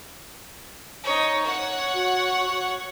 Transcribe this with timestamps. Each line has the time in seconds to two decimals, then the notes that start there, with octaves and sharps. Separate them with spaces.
1.04 D#4 C#5
1.44 C#5 F#5
1.94 F#4